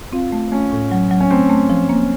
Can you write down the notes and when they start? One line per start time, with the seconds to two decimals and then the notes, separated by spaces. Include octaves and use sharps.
0.13 C4 F4
0.32 A3
0.52 A3 C#4
0.72 A2
0.91 F#3
1.11 F#3
1.21 C#4
1.31 A3 C4
1.50 A3
1.70 F3
1.89 A#3